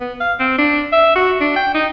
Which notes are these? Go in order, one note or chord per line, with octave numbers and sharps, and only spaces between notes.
B3
F5
C4
D4
E5
F#4
D4
G5
D#4